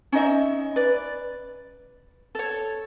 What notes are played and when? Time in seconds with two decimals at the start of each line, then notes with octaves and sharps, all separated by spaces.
0.12 C#4 D#4 D#5 E5
0.76 B4 D5
2.35 A4 C#5